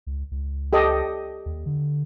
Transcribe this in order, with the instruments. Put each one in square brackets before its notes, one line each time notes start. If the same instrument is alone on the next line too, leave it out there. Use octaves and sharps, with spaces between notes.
[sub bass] C#2
C#2
[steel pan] G4 A4 D#5
[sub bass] D#2
D3